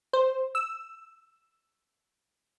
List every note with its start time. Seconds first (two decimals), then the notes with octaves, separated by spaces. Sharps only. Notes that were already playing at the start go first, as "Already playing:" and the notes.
0.13 C5
0.55 E6